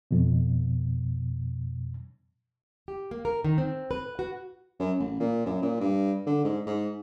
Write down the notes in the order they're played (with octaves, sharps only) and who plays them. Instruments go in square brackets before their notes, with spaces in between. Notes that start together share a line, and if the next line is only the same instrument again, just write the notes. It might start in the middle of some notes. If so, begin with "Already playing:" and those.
[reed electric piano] F2 B2
[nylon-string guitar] G4
A#3
A#4
D#3
C4
B4
F#4
[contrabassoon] F#2
A1
A#2
F#2
A#2
G2
D3
G#2
G#2